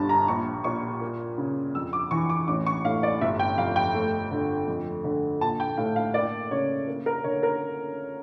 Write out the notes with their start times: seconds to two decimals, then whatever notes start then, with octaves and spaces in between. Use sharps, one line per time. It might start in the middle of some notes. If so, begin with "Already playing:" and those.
Already playing: G1 G2 A5
0.09 A#5
0.28 A#1 C#6
0.64 A#2 C#6
1.01 A#3
1.38 C#3
1.75 F2 E6
1.93 D6
2.11 E3 C#6
2.30 D6
2.48 A1 D6
2.66 C#6
2.85 A2 F5
3.03 D5
3.21 G1 E5
3.40 G5
3.58 F2 F5
3.76 G5
3.94 A3
4.31 D3
4.68 F2
5.04 D3
5.41 A#1 A5
5.60 G5
5.77 A2 F5
5.96 F5
6.14 A#3 D5
6.51 C#3 C#5
6.88 A#3
7.06 A#4
7.24 D3 C#5
7.43 A#4